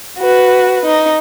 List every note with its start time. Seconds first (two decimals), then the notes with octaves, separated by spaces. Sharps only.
0.19 F#4 B4
0.85 D#4